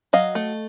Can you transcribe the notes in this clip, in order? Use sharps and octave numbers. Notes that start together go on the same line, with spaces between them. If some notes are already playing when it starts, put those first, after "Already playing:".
F#3 D#5 F5
A3